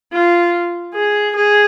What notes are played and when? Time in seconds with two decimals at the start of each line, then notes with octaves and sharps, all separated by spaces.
0.12 F4
0.95 G#4
1.36 G#4